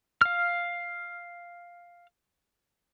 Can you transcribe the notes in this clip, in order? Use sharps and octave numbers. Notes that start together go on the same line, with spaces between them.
F5 F6